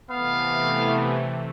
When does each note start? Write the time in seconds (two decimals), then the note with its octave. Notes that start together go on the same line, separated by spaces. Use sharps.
0.10 C3 E3 A3 B3 F5